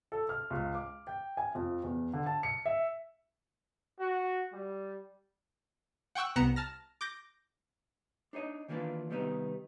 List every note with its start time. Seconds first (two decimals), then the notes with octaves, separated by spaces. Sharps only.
0.12 A4
0.29 F6
0.50 C#2
0.75 D6
1.07 G5
1.37 G#5
1.55 F2
1.84 E2
2.13 D3
2.26 A5
2.43 C#7
2.66 E5
4.00 F#4
4.53 G3
6.15 F#5 G5 C#6 E6 F#6
6.36 C2 B3 A#5 F#6 C#7 E7
6.56 A5 F6 A#6
7.01 D6 G6 A#6
8.33 D4 D#4 C#5 D#5
8.68 D#3 E3 A#3 D4 F4 B4
9.10 C3 D#3 G3 B3 D#4